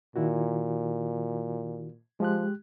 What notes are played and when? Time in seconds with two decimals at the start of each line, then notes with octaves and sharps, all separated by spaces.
0.16 A#2 D#3 E4 F#4
2.20 F3 G#3 G4 F#6